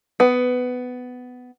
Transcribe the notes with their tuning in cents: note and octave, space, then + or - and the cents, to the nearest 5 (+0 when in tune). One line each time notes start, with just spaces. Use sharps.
B3 +15